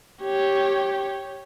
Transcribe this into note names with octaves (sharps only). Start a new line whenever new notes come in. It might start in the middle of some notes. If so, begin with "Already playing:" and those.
G4 C#5